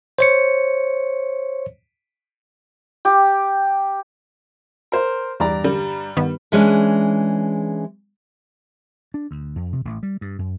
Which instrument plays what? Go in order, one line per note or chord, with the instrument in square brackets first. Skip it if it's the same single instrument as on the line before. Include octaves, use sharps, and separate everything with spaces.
[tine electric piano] C5 C#5 C#7
[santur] G4
[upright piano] A#4 C5
[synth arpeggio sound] E2 [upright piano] G2 D5 A#5
[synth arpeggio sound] D3 [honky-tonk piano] G3
[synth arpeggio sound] G2 D#3 B3
[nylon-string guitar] E3 G#3 C#4 D4
[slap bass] D4
D2
F2
C3
A1
G3
G2
F#2